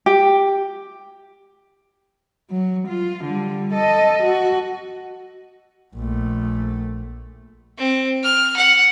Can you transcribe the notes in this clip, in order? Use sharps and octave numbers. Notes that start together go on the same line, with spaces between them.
G4
F#3
F4
D3 G3
A4 D#5
F#4
A#1 A3
C4
F6
F#5